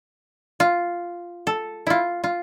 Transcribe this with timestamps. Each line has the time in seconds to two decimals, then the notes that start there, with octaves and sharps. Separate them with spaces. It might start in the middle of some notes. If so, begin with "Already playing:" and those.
0.60 F4
1.47 A4
1.87 E4 F4
2.24 F4